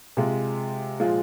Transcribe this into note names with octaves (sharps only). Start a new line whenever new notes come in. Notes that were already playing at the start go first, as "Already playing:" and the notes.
C3 G#3 F4
A#2 F3 G#3 F4